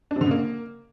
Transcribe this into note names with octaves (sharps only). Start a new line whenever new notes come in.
D4
C3
D3
C#3
A#3